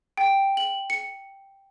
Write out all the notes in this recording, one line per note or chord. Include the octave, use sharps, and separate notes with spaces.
G5
F#7
C#7